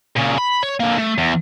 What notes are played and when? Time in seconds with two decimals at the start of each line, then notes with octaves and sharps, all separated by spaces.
0.16 A#2 C#3
0.38 B5
0.63 C#5
0.80 D3 A#3
0.98 A3
1.18 E2